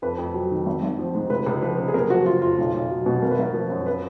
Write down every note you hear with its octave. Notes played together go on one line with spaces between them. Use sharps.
F2 B4
F2
F#3
D#3
G#1
G#1
F3
G#2
C#2 B4
C#2
F3 B4
C#3
G#4
F#1 A#4
F3 F#4
C#3 F4
F2 F4
B1
B1
F#3
B2
G#1 A#4
B4
G#1 A#4
F3
F#2
B4